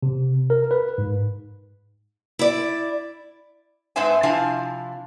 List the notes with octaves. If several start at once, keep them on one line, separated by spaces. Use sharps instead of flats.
C3
A#4
B4
G#2
E4 D5
G#2 C4 B4 C5 E5 G#5
C3 F3 D4 E4 F5 G#5